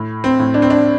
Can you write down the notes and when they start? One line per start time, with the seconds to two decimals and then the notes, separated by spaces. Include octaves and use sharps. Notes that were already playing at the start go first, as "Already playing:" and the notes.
Already playing: A2
0.24 C4
0.39 A2
0.54 D4
0.62 C4
0.70 D4